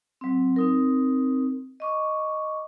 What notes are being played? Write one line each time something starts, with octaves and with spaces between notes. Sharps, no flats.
F#3 C4
C4 D#4 A#4
D#5 C#6 D6